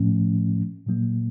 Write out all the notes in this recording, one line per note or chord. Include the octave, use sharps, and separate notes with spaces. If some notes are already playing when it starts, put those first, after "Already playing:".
Already playing: A2 F3 A3 C#4
A#2 F#3 A#3